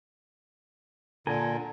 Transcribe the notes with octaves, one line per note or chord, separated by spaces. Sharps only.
A#2 D3 A4 A#4 G#5